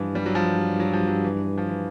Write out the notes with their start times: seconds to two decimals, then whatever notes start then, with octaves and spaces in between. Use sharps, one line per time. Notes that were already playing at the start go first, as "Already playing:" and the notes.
Already playing: G2 E3 F3
0.15 G3
0.26 F#3
0.35 F3
0.80 F#3
0.93 F3
1.08 F#3
1.25 E3
1.58 F3
1.69 E3